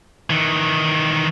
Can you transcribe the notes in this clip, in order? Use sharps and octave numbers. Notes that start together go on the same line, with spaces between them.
D#3 E3